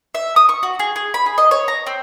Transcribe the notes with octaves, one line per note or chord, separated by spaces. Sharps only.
E5
D#6
C#6
F#4
G#4
G#4
B5
G#4
D#5
C#5
A#5
C4